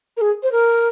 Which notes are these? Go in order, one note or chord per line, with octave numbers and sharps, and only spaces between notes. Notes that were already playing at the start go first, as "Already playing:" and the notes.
A#4
G#4
C5
A#4